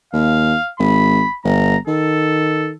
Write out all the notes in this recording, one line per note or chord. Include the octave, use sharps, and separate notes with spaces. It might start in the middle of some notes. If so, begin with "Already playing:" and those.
D#2 F5
G#1 B5
G1 A#5
D#3 A4